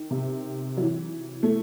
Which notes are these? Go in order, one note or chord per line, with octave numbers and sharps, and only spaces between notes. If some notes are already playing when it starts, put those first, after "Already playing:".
Already playing: D#3
C3
F#3
E3
A3